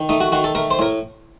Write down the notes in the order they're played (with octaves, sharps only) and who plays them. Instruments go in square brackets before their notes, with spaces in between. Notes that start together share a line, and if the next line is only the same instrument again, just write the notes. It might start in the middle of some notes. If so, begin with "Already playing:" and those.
Already playing: [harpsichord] D#3
A3 D#4
F#4
D#3 F#4
A4
A3 A#4
C5
A2 A#4